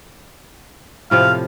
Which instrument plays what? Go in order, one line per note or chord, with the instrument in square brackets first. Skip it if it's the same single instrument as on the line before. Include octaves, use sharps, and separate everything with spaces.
[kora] A2 C3 F3 [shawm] F5